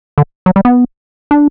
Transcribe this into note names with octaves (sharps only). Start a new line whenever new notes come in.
D3
F#3
G3
B3
D4